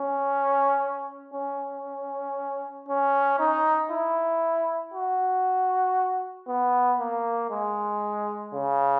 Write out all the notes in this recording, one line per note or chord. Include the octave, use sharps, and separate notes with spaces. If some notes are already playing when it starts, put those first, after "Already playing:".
Already playing: C#4
C#4
C#4
D#4
E4
F#4
B3
A#3
G#3
C#3